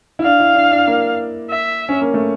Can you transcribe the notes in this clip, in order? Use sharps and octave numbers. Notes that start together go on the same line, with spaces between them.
E4
D4 F5
E4
D4
D4
A#3
E5
C#4
A#3
A3